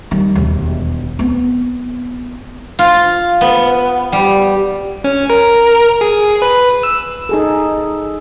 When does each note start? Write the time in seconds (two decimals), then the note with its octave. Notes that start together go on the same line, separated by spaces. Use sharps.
0.11 D#3 G3
0.35 E1 D#2
1.19 B3 C4
2.79 F4
3.41 B3
4.12 G3
5.04 C#4
5.30 A#4
6.01 G#4
6.42 B4
6.83 E6
7.29 D#4 G#4 A4